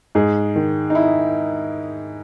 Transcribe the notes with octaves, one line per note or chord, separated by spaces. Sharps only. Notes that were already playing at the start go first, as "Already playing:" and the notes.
G#2 G#4
D#3
D#4
E4